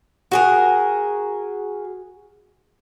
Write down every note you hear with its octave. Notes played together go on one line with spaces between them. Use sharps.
F#4 G#4 A#4